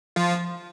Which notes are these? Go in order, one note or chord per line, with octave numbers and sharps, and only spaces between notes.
F3 F4